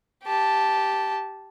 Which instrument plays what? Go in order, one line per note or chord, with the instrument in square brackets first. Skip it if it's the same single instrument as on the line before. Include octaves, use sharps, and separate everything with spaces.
[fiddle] G4 A5